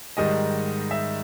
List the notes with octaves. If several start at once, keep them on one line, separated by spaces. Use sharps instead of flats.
G#2 D#3 G3 D#5
E5